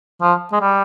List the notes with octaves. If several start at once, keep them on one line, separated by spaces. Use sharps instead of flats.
F3
G#3
G3